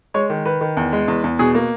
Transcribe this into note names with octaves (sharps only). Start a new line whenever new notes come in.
G#3 C#5
D#3
D#3 B4
D#3
E2
G#3
E2
E2
B2 G#4
A#3